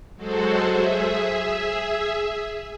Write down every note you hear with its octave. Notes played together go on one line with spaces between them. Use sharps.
F#3 G#3 F#4 A4 C5
G#4 E5